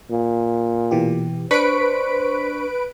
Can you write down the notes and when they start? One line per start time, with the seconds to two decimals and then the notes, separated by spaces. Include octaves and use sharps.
0.11 A#2
0.91 B2 E3 G4
1.51 D4 B4 C5 C#6 B6 D7